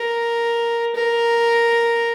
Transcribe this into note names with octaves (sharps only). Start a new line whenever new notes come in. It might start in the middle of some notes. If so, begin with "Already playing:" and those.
Already playing: A#4
A#4